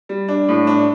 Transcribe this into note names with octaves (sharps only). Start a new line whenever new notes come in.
G3
D4
A2
D4